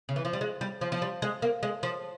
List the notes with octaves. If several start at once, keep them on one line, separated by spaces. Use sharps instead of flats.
C#3
E3
F3
G3
G#3
G3
F3
F3
G3
G#3
A#3
G#3
F3